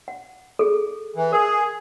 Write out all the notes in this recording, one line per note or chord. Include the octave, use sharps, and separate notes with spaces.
F#5
G#4 A4
E3
G#4 A#4